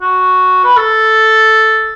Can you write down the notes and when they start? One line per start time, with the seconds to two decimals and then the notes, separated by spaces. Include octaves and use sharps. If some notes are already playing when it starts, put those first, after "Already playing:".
0.02 F#4
0.64 B4
0.77 A4